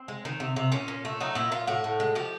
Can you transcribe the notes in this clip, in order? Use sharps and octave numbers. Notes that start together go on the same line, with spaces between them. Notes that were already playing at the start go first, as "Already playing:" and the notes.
Already playing: C4
G#3
D#3
C3
C3
A#2 C#4
A#2
A3
F#3 D#4
A#2 E4
A#2 F4
A2 F#4
A2
G#3
F3 G4